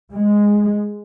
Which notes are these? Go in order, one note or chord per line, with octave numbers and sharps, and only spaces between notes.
G#3